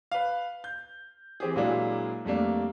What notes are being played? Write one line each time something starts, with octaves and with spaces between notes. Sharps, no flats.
B4 F5
G6
E3 C4 G4 G#4
A#2 F#3 G#3 A#3 D4 E4
F2 G3 A3 A#3 D4